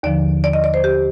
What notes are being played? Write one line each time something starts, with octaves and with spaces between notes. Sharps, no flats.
D#2 D3 F3 D5
D5
D#5
D5
C5
G4